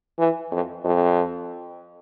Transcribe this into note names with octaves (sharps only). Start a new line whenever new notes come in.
E3
F2
F2